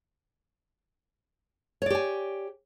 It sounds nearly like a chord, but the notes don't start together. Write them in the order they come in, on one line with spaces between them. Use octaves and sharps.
C#5 D5 G4 G#5